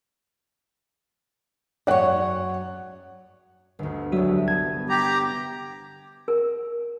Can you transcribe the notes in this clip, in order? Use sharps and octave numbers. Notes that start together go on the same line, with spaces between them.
F#2 F#3 C#5 D5 F#5
G1 D2
C2 F#3 G3 F#4 E5
B3 A5 G#6
G4 A#5
A#4